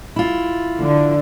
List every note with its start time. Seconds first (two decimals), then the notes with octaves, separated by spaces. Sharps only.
0.16 E4 F4
0.79 D3